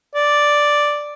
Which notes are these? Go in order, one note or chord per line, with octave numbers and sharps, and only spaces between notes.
D5